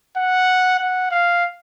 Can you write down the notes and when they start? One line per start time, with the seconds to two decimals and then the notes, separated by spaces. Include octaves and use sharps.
0.17 F#5
0.79 F#5
1.11 F5